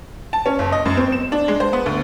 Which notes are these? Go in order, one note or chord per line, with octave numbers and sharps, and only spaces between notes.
A5
C#4
F#1
D#5
F#2
C4
E7
D4
G#3
C5
B3
D2